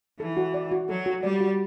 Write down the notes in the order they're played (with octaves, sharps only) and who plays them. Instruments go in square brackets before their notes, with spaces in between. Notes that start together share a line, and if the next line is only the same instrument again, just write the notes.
[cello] E3 [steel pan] A4
[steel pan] F#4
D5
F#4
[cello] F#3 [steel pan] A4
[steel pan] F#4
[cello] G3 [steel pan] D5
[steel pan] F#4